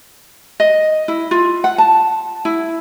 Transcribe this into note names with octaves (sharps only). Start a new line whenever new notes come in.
D#5
E4
F4
F#5
A5
E4